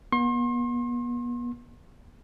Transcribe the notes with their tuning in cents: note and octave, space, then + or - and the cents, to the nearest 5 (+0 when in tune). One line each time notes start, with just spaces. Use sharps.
B3 -40 C6 +40